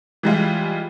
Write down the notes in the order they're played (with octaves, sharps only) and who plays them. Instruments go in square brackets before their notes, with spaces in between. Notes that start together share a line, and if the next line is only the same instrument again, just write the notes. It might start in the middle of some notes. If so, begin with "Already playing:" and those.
[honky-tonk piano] E3 G3 G#3 F4